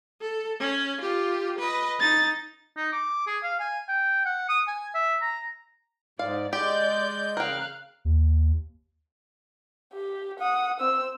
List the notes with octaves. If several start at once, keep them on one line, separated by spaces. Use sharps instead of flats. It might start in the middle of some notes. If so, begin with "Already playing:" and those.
A4
C#4
F4 G4
B4 D#5
D#4 A6
D#4
D6
G#4
F5
G#5
G5
F#5
D#6
G#5
E5
A#5
G#2 D5 F5
G#3 G4 D5 G6
C#3 A#4 F5 G5 F#6
D#2
G4
F#5 D#6
C4 E6